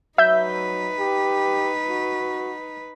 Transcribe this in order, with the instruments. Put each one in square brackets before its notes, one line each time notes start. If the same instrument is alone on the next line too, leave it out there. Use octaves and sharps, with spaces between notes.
[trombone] F#3 [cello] D#4 B4 [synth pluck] E5 G6
[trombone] G4
F#4